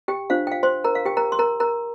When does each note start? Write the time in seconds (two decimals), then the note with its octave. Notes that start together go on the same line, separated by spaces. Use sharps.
0.08 G4 G5
0.30 D4 F4 C5 F5
0.47 G5
0.52 F5
0.63 C5 C6
0.84 A#4 A#5
0.95 F5
1.05 G4 G5
1.17 A#4 A#5
1.32 C6
1.39 A#4 A#5
1.60 A#4 A#5